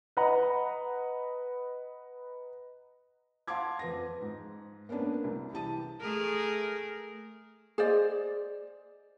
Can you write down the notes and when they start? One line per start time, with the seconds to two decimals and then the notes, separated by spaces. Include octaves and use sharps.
0.17 B4 D#5 F#5 A#5
3.47 F5 F#5 A5 C6 D6 G#6
3.79 F2 B4 A#6
4.21 G#2
4.89 A#3 B3 C#4 D4 B4
5.24 C2
5.52 E3 G4 A5 D#7
6.00 A3 G#4 A#4
7.78 G#4 C5 D5 D#5